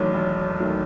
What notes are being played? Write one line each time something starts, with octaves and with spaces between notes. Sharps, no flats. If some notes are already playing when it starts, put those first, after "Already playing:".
Already playing: E1 E2 D#3 F#3 A3 C#5
E1
D#3 F#3 A3